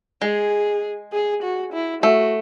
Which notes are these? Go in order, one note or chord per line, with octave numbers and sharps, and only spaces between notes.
G#3 G#4
G#4
F#4
E4
A3 F#4